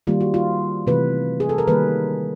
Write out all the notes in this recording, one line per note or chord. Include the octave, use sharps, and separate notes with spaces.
D#3 G3 A#3 F4
F#4
F4
C3 E3 A3 B4
G#4
A4
A#4
D#3 G3 A#3 B4